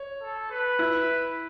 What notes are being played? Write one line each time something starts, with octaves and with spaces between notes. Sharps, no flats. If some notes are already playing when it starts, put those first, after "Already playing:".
Already playing: C#5
A4
B4
E4